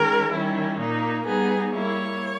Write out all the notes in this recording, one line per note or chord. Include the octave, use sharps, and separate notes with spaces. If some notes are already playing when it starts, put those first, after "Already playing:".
Already playing: D#3 G#3 C#4 A#4
D#3 G3 C#4 E4
A#2 A#3 D#4
G3 B3 D#4 G#4
G3 A#3 E4 C#5